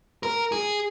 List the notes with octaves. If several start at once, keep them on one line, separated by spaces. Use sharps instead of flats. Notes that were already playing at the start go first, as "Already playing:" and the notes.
A#4
G#4